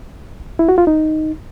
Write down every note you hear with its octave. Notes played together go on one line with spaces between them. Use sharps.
E4
F#4
F4
D#4